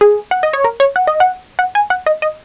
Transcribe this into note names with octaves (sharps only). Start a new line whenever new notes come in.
G#4
F#5
D#5
C#5
A#4
C#5
F#5
D#5
F#5
F#5
G#5
F#5
D#5
D#5